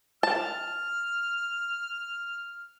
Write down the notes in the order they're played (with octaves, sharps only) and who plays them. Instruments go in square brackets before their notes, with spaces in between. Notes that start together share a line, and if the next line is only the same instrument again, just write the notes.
[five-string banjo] A5 [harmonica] F6